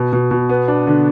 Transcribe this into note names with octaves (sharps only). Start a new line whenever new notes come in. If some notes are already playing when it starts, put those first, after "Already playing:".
Already playing: B2
B2
B2
B3
D4
D3